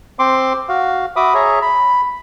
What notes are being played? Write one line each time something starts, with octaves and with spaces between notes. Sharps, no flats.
C4 C6 D6
F#4 F5
F#4 E5 B5 D6 D#6
G#4 C#5 E5 A#5
B5